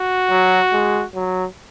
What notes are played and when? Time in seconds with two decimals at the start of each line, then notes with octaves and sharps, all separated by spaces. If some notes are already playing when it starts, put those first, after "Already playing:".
Already playing: F#4
0.30 F#3
0.72 G#3
1.15 F#3